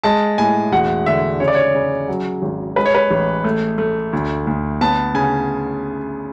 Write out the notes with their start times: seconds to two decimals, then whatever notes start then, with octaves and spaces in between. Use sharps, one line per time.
0.03 G#3 A5
0.38 A2 G#5
0.72 E1 F#5
1.06 D3 E5
1.40 C#3 C#5
1.48 D5
1.55 C#5
1.75 C#3
2.08 F#3
2.42 G#1
2.76 G#3 B4
2.86 C#5
2.95 B4
3.11 A1
3.44 A3
3.78 A3
4.13 D2
4.47 D2
4.81 B3 A5
5.14 C#3 G#5